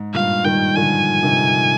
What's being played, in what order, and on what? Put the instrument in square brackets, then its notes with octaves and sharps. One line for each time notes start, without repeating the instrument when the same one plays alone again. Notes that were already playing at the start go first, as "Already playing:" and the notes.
Already playing: [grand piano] G#2
[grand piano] G2 A#2 [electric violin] F5
[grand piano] D#3 G3 [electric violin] G5
[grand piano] D3 F3 [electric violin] G#5
[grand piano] C3 D#3